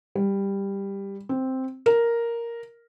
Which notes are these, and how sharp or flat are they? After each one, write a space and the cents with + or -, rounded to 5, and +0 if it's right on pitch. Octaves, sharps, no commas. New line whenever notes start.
G3 +10
C4 +0
A#4 +0